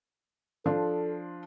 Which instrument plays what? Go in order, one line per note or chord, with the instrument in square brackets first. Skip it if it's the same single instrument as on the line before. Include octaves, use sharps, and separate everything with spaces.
[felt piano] F3 D4 F4 [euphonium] A4